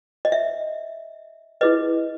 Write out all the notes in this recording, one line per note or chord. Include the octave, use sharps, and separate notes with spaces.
D#5
E5
E4 G#4 B4 D#5